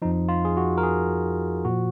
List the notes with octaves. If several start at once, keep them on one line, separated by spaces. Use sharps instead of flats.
F2 F3 D#4
F4
G#4
F#4
A#4
G#4
A#2 F3 F#4